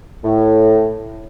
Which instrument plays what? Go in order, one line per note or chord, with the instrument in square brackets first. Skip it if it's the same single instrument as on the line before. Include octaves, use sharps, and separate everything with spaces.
[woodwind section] A2